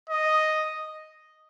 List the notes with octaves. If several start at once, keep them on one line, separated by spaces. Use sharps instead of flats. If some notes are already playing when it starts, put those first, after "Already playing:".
D#5